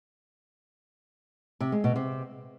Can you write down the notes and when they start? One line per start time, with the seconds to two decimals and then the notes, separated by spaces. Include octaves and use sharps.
1.61 C3
1.72 G#3
1.84 B2
1.96 C3